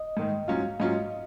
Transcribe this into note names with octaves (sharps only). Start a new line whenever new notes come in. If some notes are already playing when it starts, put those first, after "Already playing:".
Already playing: D#5
G#2 D#3 G#3
G#2 F#3 C#4 F4 F5
G#2 F#3 C#4 F4 D#5